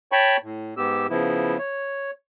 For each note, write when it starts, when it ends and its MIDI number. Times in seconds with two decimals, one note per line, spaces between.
0.12 0.37 73
0.12 0.37 79
0.12 0.37 81
0.12 0.37 83
0.12 0.37 85
0.43 0.74 45
0.77 1.07 44
0.77 1.07 59
0.77 1.07 67
0.77 1.07 88
1.10 1.57 49
1.10 1.57 53
1.10 1.57 59
1.10 1.57 64
1.58 2.11 73